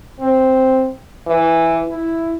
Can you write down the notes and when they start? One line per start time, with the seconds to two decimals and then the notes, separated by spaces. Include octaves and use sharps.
0.20 C4
1.27 E3
1.88 E4